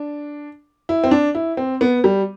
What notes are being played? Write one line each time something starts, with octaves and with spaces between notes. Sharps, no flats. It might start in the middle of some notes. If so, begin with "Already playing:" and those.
Already playing: D4
E4
C4
D4
E4
C4
B3
G3